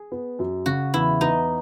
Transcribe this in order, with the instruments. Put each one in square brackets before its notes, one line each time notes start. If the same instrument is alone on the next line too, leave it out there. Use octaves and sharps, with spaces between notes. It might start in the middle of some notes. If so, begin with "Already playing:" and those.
Already playing: [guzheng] G#4
[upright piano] B3
F#2
[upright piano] C#3 [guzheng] F#4
[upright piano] E2 [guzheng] E4
[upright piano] B3 [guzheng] D#4